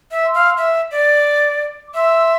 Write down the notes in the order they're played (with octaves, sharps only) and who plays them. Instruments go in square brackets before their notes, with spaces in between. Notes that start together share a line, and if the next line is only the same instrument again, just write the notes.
[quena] E5
[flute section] C6 E6
[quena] F5
E5
D5
[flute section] D6
[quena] E5 [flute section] C6 E6